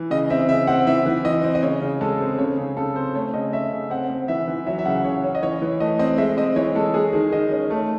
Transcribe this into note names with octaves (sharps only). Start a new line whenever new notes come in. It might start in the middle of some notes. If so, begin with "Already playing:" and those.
Already playing: E3
C#3 D#5
C4 E5
C#3 E5
C4 F#5
E3 E5
E3
E3 D#5
C4
D#5
C#3 C#5
C#3
G#3 A4
C4
C#3 C#5
C#3
C#3 A4
C4 C5
A3 C#5
C#3 D#5
C#4 E5
C#3
C4 F#5
C4
E3 E5
E3
F#3 E5
E5
C#3 F#5
C#3 C#5
C#4
D#5
E3 C#5
E3
A3 D#5
C4 D#5
G#3 E5
C4 D#5
E3 C#5
G#3 A4
G#3 G#4
D#3 G#4
D#3 D#5
C#4
A3